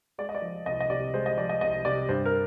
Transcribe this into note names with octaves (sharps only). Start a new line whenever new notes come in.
G#3 D5
D#5
D5
F3
C2 D#5
D#5
C3 D5
G#3 C5
D#5
F3 D5
D#5
C2 D#5
C3 D5
G2 C5
A#4